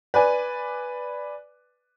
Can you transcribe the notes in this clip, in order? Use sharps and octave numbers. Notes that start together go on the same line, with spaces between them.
B4 D5 G#5